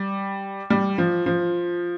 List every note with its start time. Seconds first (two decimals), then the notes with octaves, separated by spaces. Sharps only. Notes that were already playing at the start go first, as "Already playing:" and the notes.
Already playing: G3
0.70 G3
0.98 F3
1.26 F3